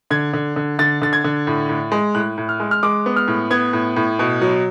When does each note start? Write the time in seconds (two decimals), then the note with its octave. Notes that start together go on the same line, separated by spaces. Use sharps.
0.10 D3 G#6
0.33 D3
0.56 D3
0.79 D3 A6
1.02 D3 A6
1.13 G#6
1.24 D3
1.47 A2
1.69 A2
1.92 G#3
2.15 A2 F#6
2.38 A2
2.49 F6
2.60 G#3
2.71 F6
2.83 G#3 D6
3.06 B3
3.16 F6
3.28 A2
3.50 B3 G#6
3.73 A2
3.96 A2
4.19 B2
4.41 F#3